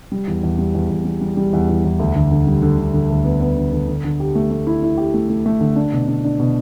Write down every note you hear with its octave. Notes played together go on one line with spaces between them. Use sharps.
G3
E2
E2
G3
E2
E2
G3
G3
G3
E2
E2
E2
D2
D3
D3
G3
D3
D3
D3
D2
B3
B3
D3
D3
D3
D3
G4
A3
A3
E4
E4
G4
A3
A3
A3
D3
D4
B2
D4
D4
B2